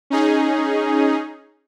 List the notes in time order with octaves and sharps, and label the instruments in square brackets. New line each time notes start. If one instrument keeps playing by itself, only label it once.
[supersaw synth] C#4 D#4 G#4